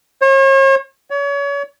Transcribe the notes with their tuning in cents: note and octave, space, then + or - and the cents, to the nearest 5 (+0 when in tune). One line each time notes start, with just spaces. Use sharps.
C#5 -40
C#5 +35